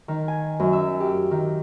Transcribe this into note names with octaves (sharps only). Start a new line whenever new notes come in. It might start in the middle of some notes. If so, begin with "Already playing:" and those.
D#3
G#5
F#2
E5
G4
D#3